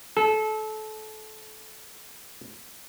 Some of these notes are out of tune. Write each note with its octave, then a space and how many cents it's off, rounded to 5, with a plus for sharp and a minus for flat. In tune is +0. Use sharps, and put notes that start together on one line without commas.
A4 -25